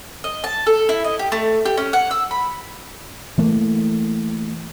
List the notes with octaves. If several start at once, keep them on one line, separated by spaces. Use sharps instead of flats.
D#5
A5
A4
E4
D#5
G4
A3
G4
C#4
F#5
E6
B5
E3 A3 A#3